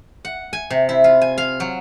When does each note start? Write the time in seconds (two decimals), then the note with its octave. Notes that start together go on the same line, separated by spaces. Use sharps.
0.25 F#5
0.53 G#5
0.70 C3
0.89 E4
1.04 F4
1.21 G#5
1.38 F5
1.60 F#3